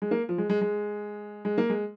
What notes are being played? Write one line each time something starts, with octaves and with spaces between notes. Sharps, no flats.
G#3
A#3
F3
G#3
G#3
G#3
G#3
A#3
G#3